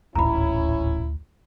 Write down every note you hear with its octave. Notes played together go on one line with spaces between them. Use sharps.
D#1 A1 D2 G#2 C#4 E4 A#5 B5